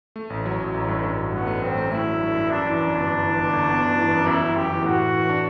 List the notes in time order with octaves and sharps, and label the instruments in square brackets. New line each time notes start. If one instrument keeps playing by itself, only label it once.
[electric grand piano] A3
A1
F#3
A1
A1
G2
G2
A1
[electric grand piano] G2 [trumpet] B3
[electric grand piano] A3
[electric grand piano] A1 [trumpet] C4
[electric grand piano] A3
[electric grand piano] A3 [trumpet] E4
[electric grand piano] A3
G2
G2
[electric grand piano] F#2 [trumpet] D4
[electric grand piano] E3
F#2
G1
G1
E3
G1
G1
B3
G1
E3
F#2
[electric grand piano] F#2 [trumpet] E4
[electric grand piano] F#2
[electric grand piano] F#2 [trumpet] G4
[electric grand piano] E3
[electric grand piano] A2 [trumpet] F#4
[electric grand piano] A2
E3
D4